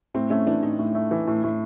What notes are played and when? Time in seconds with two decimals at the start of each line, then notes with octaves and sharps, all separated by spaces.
0.14 A2 C4
0.30 A3 C#4
0.47 E3 D4
0.63 A2 D#4
0.79 A2
0.95 A3
1.11 E3
1.27 A2
1.43 A2